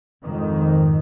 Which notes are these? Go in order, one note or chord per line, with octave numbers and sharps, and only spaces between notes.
F2 G#2 D#3